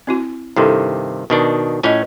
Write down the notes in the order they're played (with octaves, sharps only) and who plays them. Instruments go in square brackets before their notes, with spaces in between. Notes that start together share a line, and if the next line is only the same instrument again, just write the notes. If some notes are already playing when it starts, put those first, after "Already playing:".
[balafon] C4 E4 F#4
[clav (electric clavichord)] G2 C3 D#3 [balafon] E4 A4
[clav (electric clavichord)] B2 D#3 D4
[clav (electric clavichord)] A2 C#4 G#5 [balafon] F4 D#5